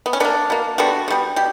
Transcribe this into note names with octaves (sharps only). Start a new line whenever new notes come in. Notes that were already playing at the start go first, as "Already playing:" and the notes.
B3
C#4
B2 A#3 B3 D4
B2 A#3
D3 G3 B3 D4 F#4
D3
G3 B3
B2 G4